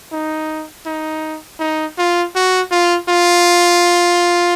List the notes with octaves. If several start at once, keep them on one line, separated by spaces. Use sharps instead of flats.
D#4
D#4
D#4
F4
F#4
F4
F4